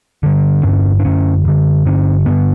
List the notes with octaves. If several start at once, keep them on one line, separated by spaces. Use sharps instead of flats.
G2 D3
G2 D3 C#4
D4
F#2 D3 C#4
F#2 D3
G2 D3 C#4
G2 D3 B3